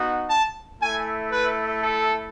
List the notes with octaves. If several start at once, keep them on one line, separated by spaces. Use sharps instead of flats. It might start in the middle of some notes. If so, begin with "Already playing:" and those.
Already playing: B3 D#4 F#4
A5
A3 E4 G#5
B4
A4